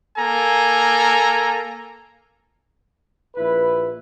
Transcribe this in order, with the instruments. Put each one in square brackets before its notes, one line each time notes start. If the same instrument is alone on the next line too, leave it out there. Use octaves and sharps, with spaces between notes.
[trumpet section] A#3 A4 G#5 A#5
[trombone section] A#1 E4 B4